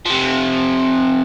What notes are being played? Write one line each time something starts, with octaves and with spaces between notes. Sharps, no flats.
C3 F3